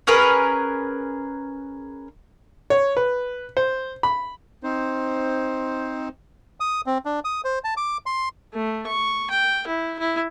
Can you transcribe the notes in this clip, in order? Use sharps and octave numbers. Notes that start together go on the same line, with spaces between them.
C#4 G#4 A#4 B4
C#5
B4
C5
B5
C4 D#4 C5
D#6
C4
D4
D#6
C5
A5
D6
C6
A3
C#6
G5
E4
E4